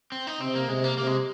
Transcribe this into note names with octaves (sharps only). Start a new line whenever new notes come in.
C4
D#4
C3 C4
A#3
C3 G#3
A#3
C3 A#3
G#3